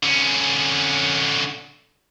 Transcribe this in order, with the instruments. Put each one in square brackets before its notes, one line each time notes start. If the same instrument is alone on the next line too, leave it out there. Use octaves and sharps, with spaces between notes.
[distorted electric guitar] D3 C#4